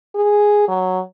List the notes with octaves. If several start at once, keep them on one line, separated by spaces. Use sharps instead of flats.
G#4
F#3